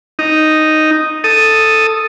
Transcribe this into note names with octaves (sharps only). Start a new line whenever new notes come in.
D#4
A4 D#6